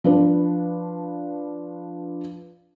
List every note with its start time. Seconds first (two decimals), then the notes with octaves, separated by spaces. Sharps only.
0.04 F3 D4 B4